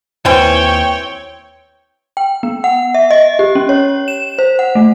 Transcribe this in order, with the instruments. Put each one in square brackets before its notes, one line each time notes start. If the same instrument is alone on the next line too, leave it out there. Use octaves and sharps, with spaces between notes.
[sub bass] D#2 [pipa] B2 E3 C4 [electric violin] C#5 G5
[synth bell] G5
B3
F#5
E5
D#5
G4
C#4
C#5
E7
C5
F#5
A3